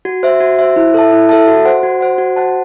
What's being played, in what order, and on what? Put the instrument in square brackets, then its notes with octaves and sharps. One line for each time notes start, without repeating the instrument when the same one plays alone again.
[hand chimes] F#4
C5 E5
F#4
C5 E5
E4
A4 E5 A5
E4
A4 E5 A5
F#4
C5 F#5
F#4
C5 F#5
F#4
C5 F#5 A5